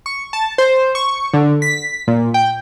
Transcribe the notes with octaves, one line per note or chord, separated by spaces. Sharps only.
C#6
A5
C5
C#6
D3
B6
A#2
G5